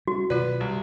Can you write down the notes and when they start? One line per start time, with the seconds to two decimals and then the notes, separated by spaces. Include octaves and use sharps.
0.07 G3 C#4 F#4
0.30 B2 D#3 F#3 F4 B4 D5
0.60 C2